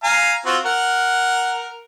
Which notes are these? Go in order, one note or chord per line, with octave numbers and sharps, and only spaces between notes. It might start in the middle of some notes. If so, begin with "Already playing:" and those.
F5 G#5 A#5
C4 F4 F#4
A#4 F#5